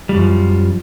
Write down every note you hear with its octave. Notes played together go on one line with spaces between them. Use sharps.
F#2 F3 G3